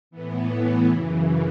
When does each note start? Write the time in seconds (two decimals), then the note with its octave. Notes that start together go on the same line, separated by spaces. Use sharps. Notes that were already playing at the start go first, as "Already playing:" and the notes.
0.11 A2 E3 B3
0.87 F#2 C#3 E3